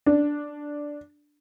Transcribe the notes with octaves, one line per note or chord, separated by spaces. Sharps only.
D4